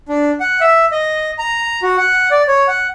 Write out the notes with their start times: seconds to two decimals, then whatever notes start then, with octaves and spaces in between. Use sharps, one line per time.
0.09 D4
0.40 F#5
0.61 E5
0.92 D#5
1.39 A#5
1.83 F#4
1.97 F#5
2.31 D5
2.48 C#5
2.68 F#5